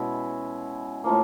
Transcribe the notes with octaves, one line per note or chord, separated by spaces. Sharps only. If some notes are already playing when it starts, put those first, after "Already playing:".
Already playing: B2 G#3 C#4 E4
A2 F3 A#3